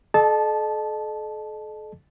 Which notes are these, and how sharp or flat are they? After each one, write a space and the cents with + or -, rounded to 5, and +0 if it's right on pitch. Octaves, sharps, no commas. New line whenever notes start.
A4 -40 D#5 -40 A5 -15